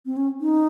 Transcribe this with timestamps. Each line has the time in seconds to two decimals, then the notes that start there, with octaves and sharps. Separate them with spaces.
0.06 C4
0.17 C#4
0.41 D#4